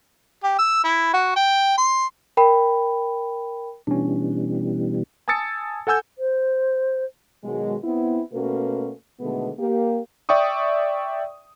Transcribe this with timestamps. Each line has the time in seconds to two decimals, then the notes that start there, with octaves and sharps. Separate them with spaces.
0.44 G4
0.59 E6
0.84 E4
1.14 F#4
1.36 G5
1.78 C6
2.37 A#4 G5 B5
3.87 B2 E3 G3 C#4 D4
5.28 G#5 A5 D#6 E6 A6 C#7
5.87 A4 F#5 G#5 E6 G6
6.18 C5
7.43 B2 D#3 F#3 G#3
7.83 B3 C4 E4
8.32 B2 A3 A#3 C#4 F#4 B4
9.20 B2 D3 D#3 G#3 A3 B3
9.59 A#3 G4
10.29 D5 E5 G5 C#6 D#6